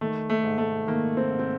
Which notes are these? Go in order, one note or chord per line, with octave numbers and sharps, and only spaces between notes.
D#3 A3
A3
G#2
A3
D#3 A#3
C4
G#2
C4